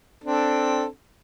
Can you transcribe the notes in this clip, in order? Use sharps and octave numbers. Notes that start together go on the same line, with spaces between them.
C4 D4 A4